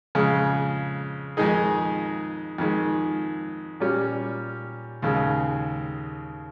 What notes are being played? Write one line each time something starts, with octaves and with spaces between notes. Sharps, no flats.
F2 C#3 G#3
F2 D#3 G#3 D#4 G#4
F2 D#3 G#3
A#2 G3 C#4
D#2 C#3 G#3